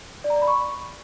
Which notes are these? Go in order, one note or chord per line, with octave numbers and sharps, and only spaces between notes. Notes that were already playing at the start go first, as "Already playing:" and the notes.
D5
A#5
D5
B5
C#6